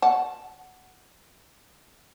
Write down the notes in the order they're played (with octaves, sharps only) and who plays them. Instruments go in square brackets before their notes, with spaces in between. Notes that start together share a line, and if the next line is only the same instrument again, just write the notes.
[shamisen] F#5 A5